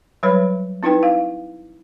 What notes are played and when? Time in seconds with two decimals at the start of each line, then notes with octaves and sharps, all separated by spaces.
0.23 F#3 G3 B4 C#5 B5
0.83 C4 D#4 E4 B4 G5
1.03 F5